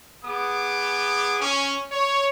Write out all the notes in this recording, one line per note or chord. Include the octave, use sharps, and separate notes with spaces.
B3 G#4 D6
C#4
C#5